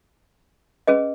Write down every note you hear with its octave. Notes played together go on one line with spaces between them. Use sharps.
C#4 G#4 B4 D#5